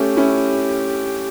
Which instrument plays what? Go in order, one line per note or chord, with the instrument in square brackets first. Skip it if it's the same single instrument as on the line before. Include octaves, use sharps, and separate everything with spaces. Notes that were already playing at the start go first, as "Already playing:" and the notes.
Already playing: [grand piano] A3 C#4 [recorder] G4
[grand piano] C#4 E4